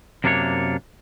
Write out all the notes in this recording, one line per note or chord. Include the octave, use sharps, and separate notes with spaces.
F#2 C3 A#3 D4 G#4 C#5